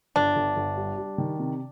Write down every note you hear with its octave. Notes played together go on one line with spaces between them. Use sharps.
G1 D4
G1
G1
G3
G3
D#3
C3